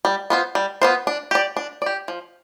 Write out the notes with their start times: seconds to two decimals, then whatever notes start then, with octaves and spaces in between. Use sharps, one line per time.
0.05 G3
0.30 B3 F4 C5
0.55 G3
0.82 B3 F4 C5
1.07 D4
1.31 G4 D5
1.57 D4
1.82 G4 D5
2.08 F3